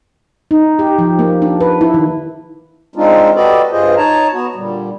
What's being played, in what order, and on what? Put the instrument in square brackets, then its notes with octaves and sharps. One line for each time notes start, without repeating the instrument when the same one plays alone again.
[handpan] D#4
G4
F3
A#3
D4
B4
E4
D#3
[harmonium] G#3 C4 D4 D#4 F4
F#4 G4 A4 B4 D5 D#5
G2 F4 G#4 C5 D#5
D#4 C#5 A5 A#5
B3 F#4
A#2 D3 G3